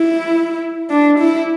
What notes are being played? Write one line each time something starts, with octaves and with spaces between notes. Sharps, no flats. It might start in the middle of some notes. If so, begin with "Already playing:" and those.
Already playing: E4
D4
E4